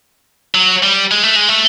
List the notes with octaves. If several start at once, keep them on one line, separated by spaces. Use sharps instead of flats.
F#3
G3
G#3
A3
G#3
A3